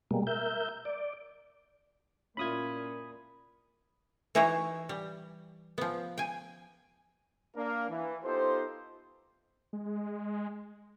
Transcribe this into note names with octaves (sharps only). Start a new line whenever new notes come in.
B2 G3 G#3 A#3
A#4 E5 G6
D5
A#2 C#4 E4 F4 B5 D#6 G#6
E3 D#4 E4 F#4 C5 C#5
G3
F3 B3
G5 G#5
A#3 D4 A#4
E3
B3 D#4 F4 G4 A4 C5
G#3